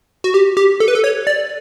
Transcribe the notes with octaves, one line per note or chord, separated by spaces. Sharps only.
F#4
G4
G4
A4
B4
A4
C#5
D5